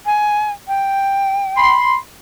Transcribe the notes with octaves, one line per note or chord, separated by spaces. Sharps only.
G#5
G5
B5 C6